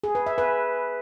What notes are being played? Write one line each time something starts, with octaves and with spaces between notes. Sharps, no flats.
G#4
B4
E5
B4